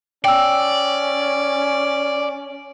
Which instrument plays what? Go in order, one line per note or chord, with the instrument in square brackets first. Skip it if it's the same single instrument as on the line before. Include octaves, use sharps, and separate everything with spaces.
[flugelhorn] C#4 [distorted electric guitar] D5 [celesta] G5 E6